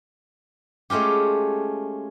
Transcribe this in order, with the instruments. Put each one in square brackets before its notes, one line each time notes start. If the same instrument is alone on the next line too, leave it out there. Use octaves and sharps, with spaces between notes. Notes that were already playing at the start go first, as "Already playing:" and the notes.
[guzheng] G#3 A3 C#4 F4 G4